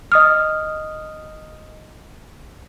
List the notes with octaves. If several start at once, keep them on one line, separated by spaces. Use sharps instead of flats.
D#5 D#6 F6